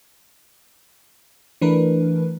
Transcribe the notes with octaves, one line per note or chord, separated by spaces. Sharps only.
E3 A3 D4 A#4 B4